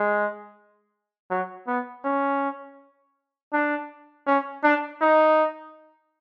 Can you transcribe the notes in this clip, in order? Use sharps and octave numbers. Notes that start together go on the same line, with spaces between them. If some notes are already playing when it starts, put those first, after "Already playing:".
Already playing: G#3
F#3
B3
C#4
D4
C#4
D4
D#4